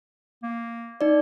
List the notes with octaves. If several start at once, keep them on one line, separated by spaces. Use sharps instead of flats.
A#3
D#4 D5